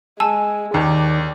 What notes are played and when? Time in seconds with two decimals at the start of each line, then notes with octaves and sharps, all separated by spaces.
0.20 G#3 G#5 A5 E6
0.74 D#2 D#3 D5